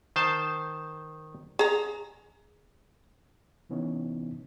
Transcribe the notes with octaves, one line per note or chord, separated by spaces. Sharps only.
D#3 C5 A5
G#4 A#5
C3 E3 B3 C#4 D#4 E4